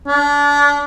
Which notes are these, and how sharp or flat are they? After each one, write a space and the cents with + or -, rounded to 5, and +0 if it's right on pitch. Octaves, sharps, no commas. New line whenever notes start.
D4 -30